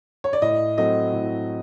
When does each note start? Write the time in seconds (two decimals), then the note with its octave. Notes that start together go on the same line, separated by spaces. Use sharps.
0.24 C#5
0.33 D5
0.42 A2 D#5
0.77 F#3 A3 C4 D#5
1.13 A2